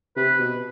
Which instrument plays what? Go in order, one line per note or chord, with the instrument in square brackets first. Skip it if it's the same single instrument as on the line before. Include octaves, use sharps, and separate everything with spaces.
[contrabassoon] C3 [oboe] B4
[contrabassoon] B2